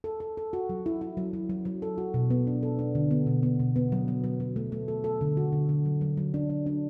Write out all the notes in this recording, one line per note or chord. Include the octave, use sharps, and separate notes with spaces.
A4
A4
A4
F#4
F#3
E4
E4
F#3
F#3
F#3
F#3
A4
F#4
B2
B3
D4
A4
D4
D3
B3
B2
B3
B2
B3
F#3
F#3
F#3
F#3
A3
A3
A4
A4
D3
F#4
D3
D3
F#3
F#3
F#3
D4
D4
D4